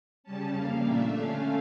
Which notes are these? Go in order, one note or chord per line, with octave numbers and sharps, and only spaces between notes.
C#3 G3 C#4 A5
F2 C#3 G3 A#3 F5
A#2 A3 D4 E5
D3 A3 C#4 F5